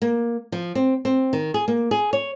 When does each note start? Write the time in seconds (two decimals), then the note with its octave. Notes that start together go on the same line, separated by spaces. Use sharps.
0.02 A#3
0.52 F3
0.75 C4
1.05 C4
1.33 D#3
1.54 G#4
1.68 A#3
1.91 G#4
2.13 C#5